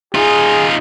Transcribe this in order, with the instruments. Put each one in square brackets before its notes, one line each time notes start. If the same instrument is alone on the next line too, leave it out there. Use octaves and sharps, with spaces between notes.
[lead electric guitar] D#4 F4 [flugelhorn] G#4